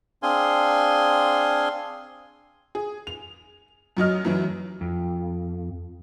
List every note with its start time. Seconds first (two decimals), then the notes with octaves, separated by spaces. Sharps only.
0.23 C4 D4 G#4 F5 G#5 C6
2.75 G#4
3.07 F7
3.97 F#2 F#3 D#5 F6
4.25 F#2 E3 F#3
4.81 F2